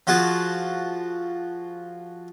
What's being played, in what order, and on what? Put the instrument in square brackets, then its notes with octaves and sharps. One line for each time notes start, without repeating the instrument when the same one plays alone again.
[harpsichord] F3 F4 F#4 G#4 A5